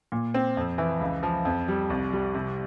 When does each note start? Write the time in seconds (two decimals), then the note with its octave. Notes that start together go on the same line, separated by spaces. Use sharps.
0.12 A#2
0.34 C4
0.57 F2
0.78 E3
1.00 C#2
1.23 F3
1.45 F2
1.68 G3
1.90 C2
2.13 G3
2.34 C3